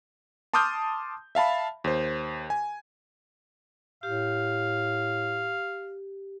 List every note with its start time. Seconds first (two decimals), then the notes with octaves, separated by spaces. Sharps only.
0.54 A5 C6 D6 D#6 F6 G6
1.35 E5 F5 A5 B5
1.84 D#2 C5
2.50 G#5
4.03 A2 G4 F5